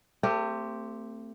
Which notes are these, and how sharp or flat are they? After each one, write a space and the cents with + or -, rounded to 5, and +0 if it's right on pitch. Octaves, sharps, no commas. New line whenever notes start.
A3 +35 C4 +0 G4 +0